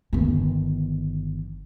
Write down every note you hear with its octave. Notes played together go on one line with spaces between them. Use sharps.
G1 D#3